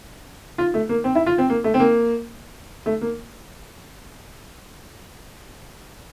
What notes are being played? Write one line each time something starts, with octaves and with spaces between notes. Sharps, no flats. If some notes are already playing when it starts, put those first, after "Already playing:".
F4
A3
A#3
C4
E4
F4
C4
A#3
A3
C4
A#3
A3
A#3